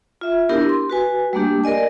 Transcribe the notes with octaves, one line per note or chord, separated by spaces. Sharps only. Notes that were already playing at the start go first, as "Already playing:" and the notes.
F4 E5
B3 D4 E4 G4 A#4
C6
F#4 B4 G#5
G3 A3 A#3 D4 G4
A#4 D5 D#5 G#5